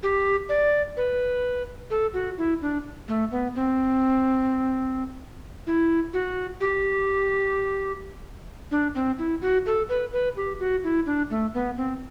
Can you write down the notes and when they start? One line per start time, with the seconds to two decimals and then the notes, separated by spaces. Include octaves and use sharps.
0.03 G4
0.49 D5
0.97 B4
1.90 A4
2.14 F#4
2.38 E4
2.62 D4
3.08 A3
3.31 B3
3.55 C4
5.67 E4
6.13 F#4
6.61 G4
8.71 D4
8.95 C4
9.19 E4
9.42 F#4
9.66 A4
9.89 B4
10.13 B4
10.36 G4
10.60 F#4
10.84 E4
11.06 D4
11.30 A3
11.54 B3
11.77 C4